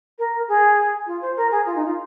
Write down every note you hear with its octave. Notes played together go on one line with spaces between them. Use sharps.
A#4
G#4
F4
C5
A#4
G#4
F4
D#4
F4